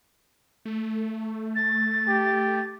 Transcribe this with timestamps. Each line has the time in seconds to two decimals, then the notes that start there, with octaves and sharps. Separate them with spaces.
0.65 A3
1.55 A6
2.08 G4